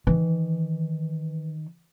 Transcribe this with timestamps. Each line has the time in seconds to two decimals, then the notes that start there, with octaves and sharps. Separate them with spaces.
0.07 D#3 E3